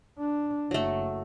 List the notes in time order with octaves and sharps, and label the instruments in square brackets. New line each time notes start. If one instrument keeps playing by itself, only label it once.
[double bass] D4
[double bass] F#1 [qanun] F#3 A3